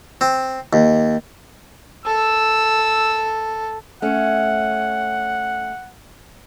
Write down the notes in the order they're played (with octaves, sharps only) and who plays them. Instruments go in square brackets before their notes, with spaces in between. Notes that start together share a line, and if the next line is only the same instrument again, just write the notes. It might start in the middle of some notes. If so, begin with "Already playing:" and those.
[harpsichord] C4
D#2
[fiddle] A4 [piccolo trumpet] E6
[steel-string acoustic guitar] A3 C#4 [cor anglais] F#5